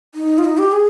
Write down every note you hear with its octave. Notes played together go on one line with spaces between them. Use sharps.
D#4
F4
D#4
G4
G#4